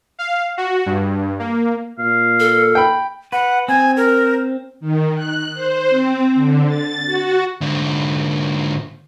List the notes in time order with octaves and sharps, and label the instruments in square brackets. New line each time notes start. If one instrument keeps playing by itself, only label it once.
[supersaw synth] F5
F#4
G2
A#3
[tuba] A#2 [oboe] F5
[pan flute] A4
[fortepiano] G5 B5
[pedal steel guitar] B4 [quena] F#5
[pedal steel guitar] C4 [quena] G#5
[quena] A#4
[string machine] D#3
F#6
C5
C4
D3
A6
F#4
[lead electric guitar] G#2 D3